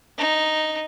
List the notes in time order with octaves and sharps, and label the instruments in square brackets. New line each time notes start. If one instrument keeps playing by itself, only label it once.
[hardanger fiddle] D#4